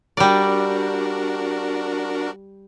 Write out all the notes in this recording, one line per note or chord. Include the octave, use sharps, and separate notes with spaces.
G3 D4 F#4 A#4 D5